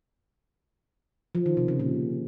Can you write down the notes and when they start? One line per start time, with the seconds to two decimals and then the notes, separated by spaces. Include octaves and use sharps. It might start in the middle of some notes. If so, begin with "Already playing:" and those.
1.35 F3
1.46 D#3
1.57 C3
1.68 C#3
1.80 A#2